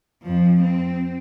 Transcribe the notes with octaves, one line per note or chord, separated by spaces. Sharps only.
F2 F3
C4